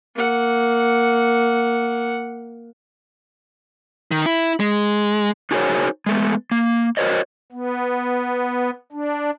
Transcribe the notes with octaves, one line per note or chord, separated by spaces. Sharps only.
A#3 F#5
D#3
E4
G#3
D#4 F#4 G#4 A#4 C5 C#5
G#3 A3 B3
A#3
F#4 A#4 C5 C#5 D#5
B3
D4